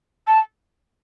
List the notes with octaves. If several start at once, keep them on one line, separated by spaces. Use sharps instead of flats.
A5